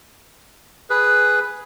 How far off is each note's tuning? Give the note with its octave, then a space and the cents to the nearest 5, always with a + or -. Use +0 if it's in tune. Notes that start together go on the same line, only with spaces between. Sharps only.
G#4 +0 B4 +5